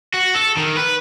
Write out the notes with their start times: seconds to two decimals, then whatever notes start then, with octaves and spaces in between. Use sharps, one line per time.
0.14 F#4
0.34 A4
0.57 D#3
0.76 B4